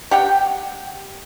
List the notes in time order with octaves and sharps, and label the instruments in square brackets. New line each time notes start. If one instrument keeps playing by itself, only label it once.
[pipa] G4 F#5 G5